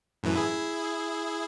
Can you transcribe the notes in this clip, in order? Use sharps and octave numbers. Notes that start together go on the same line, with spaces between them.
F#2 A2 E3
E4 G#4